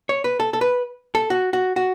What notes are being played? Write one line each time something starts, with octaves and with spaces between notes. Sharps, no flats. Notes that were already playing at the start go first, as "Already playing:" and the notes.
C#5
B4
A4
A4
B4
A4
F#4
F#4
F#4